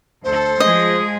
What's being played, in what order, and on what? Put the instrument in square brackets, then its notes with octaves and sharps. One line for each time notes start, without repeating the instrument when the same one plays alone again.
[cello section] D2 A4 [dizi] C5
[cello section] F3 G#3 G#4 [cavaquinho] D#5